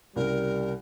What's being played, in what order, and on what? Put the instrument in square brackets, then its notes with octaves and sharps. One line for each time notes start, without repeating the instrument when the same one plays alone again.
[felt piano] C2 C#3 [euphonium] G3 [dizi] A#4